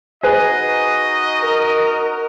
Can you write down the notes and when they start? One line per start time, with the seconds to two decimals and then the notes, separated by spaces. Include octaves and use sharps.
0.23 D#4 F#4 G#4 B4 D#5
1.41 A#4